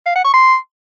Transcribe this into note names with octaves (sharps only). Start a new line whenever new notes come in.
F5
F#5
C#6
C6